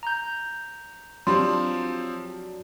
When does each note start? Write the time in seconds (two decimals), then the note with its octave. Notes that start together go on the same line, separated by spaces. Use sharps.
0.03 A#5 G6
1.27 F3 F#3 C4 D4 G4 C6